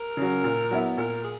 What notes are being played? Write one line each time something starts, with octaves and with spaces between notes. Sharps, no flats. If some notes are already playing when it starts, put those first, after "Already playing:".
Already playing: A#4
C#3 F#3
A#2
F#3 B3 E4
A#2 A#4
G#4